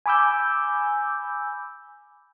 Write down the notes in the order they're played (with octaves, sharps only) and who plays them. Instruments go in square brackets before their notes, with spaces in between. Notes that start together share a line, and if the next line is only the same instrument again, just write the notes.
[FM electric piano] G#5 B5 D6 E6 G6